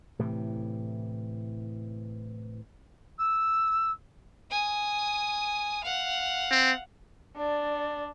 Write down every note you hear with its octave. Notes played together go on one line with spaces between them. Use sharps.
A2 C3 E3
E6
G#5 D#6
F5 F#5
C4
D4 D5